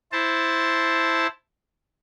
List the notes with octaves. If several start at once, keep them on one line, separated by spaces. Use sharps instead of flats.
E4 C5 A5